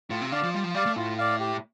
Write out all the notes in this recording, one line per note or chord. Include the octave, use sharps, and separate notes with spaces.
A2 F4
C3
D3 D5 F5
F3
G3 F4
F3
G3 D5 F5
A3
A2 F4
D5 F5
G4